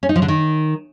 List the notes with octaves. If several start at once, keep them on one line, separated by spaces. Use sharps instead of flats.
C#4
D#4
F3
D3
D#3